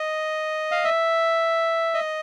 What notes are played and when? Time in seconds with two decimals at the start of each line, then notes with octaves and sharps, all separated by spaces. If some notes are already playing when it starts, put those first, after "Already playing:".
Already playing: D#5
0.71 F5
0.84 E5
1.94 D#5